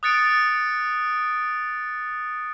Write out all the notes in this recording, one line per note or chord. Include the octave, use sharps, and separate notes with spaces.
D#6 F#6 A6 C#7 D7